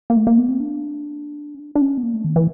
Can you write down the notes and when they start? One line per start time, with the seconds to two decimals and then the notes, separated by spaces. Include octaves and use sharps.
0.10 A#3
0.17 A3
0.27 A#3
0.38 B3
0.49 C4
0.60 D4
1.55 C#4
1.59 D4
1.75 D4
1.81 C#4
1.97 B3
2.03 A#3
2.14 A3
2.24 D#3
2.36 E3